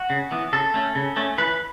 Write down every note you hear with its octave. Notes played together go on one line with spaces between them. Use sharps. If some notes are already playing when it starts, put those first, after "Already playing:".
Already playing: F#4
C#3
E3 B3
C#3 A4
A3 C#4
C#3
A3 C#4
E3 B4